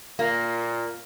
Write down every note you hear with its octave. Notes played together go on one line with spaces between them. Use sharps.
A#2 A#3